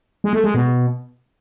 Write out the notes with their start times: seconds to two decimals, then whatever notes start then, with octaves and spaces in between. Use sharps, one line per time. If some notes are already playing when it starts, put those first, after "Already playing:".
0.24 G#3
0.33 A3
0.44 G#3
0.54 B2